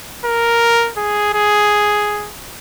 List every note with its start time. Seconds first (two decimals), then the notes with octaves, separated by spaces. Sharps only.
0.25 A#4
0.97 G#4
1.34 G#4